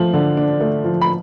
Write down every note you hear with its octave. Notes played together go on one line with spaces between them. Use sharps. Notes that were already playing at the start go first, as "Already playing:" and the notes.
Already playing: F3 A3
D3
D4
A3
F3
B5